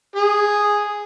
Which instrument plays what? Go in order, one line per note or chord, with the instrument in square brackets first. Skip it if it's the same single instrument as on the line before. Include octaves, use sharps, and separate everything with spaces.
[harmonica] G#4